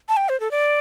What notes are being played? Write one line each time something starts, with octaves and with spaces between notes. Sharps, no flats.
A5
G5
C5
A4
D5